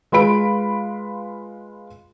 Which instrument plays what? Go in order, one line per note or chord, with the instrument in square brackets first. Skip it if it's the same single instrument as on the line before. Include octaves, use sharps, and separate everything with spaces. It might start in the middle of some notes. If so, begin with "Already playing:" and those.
[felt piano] G#3 F4 B4 B5 D7